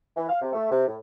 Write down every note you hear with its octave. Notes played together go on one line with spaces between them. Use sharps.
E3
F5
C3
A3
C3
A2